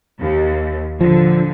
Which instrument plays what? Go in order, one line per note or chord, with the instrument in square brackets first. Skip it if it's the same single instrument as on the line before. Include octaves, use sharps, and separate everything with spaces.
[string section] D#2
[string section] A#2 D3 [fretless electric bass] F3